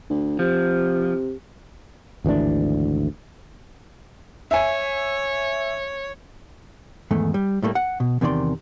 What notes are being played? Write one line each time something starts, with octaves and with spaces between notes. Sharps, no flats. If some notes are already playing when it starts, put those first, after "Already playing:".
D2
C3 F3
G#1 D2 E3 D4
C#5 E5 G#5
E2 G#2 D#3 A3
G3
A2 G3 A3 A#3
F#5
B2
E2 C3 D#3 C#5 D5 C6